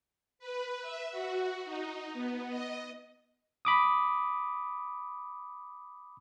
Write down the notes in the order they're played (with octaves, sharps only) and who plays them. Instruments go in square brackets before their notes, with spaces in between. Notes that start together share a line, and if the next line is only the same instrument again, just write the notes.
[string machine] B4
E5
F#4
D#4
B3
D#5
[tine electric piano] B5 D6 D#6